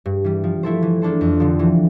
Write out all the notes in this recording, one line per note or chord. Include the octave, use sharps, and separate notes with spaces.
G2
E3 G3
F3
A3 E4 A4 C5
E3
A#3 D4 A4 C5
F2
D3 F3
E3